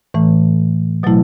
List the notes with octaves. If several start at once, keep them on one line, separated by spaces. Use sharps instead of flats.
A2 E3 A3
B2 F#3 A3 E4